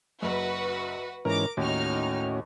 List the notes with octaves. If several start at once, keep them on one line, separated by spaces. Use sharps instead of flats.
F#1 F#2 F#4 B4
G#2 E3 C#4 A#4 A#5 D6
D#2 A2 C#4 D#4 F#4 F6